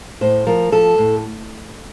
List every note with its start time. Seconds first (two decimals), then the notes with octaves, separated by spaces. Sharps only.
0.21 A2 C5
0.47 F3 A#4
0.72 F3 A4
0.98 A2